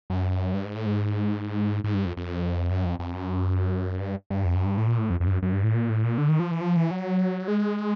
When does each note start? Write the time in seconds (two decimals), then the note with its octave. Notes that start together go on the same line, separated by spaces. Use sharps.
0.10 F#2
0.54 G2
0.65 G#2
0.75 A2
0.86 G#2
1.84 G#2
1.94 G2
2.05 F2
2.17 F2
2.71 F#2
2.85 F2
2.99 F2
3.15 F#2
4.00 G2
4.30 G2
4.45 F2
4.55 F#2
4.66 G2
4.77 A2
4.87 A#2
4.98 A2
5.10 F2
5.20 F2
5.27 G2
5.31 F#2
5.42 F#2
5.53 G2
5.64 A2
5.74 A#2
5.90 A2
6.04 A#2
6.18 D3
6.29 D#3
6.40 F3
6.51 E3
6.61 F3
6.76 E3
6.91 F#3
7.48 G#3